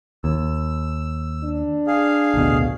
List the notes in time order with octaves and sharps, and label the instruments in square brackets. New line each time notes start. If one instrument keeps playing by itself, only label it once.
[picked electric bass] D#2 [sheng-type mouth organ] E6
[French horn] D4
[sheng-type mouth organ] G#4 F5
[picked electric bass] A1 D2 B2